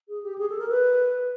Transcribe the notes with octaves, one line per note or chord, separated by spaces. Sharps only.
G#4
G4
G#4
A4
A#4
B4